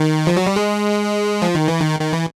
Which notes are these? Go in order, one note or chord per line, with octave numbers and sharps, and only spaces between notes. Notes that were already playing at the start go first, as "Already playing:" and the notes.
Already playing: D#3
F3
F#3
G3
G#3
F3
D#3
E3
D#3
D#3
E3